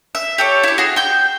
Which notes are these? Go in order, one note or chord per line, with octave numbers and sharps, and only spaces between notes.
E5
G4 A4 C#5
E4 G4
F#4 G#4
G5 G6